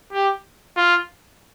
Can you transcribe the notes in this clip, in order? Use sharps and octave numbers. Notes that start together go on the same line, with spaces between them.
G4
F4